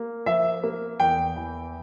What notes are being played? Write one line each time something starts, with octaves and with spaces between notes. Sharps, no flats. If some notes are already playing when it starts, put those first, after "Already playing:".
Already playing: A#3
F3 E5
A#3
E2 G5
E3